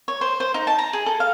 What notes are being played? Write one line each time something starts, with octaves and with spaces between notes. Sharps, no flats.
C#5
C5
C5
D#4
A5
A#5
G#4
A4
F5